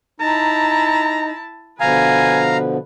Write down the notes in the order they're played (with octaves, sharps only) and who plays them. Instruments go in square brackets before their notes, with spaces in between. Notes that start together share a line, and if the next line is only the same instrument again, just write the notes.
[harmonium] D#4 [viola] E4 A5 [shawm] A#5
[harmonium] B2 D3 F3 [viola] B4 [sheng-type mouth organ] F5 A#5 [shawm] G#5